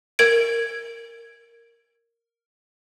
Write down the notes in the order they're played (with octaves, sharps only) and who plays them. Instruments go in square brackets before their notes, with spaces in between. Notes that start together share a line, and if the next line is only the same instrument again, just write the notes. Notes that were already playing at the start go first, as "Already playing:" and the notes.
[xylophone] A#4 G#6 D7